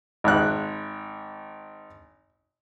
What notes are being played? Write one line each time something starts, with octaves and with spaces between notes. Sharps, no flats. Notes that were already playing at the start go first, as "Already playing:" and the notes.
G#1 F#6